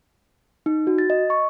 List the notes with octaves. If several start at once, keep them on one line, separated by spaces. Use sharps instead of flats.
D#4
F#4
A6
D#5
C#6